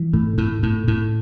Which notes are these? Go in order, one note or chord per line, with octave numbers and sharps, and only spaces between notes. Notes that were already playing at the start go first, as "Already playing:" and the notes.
Already playing: E3
A2
A2
A2
A2